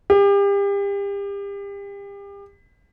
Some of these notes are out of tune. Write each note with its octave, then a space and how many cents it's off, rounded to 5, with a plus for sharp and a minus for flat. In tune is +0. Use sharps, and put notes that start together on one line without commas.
G4 +35